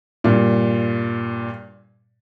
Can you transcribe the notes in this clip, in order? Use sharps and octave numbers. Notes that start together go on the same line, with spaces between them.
G2 A#2